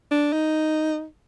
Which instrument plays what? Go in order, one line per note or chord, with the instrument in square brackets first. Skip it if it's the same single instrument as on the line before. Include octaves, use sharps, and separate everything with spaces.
[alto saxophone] D4
D#4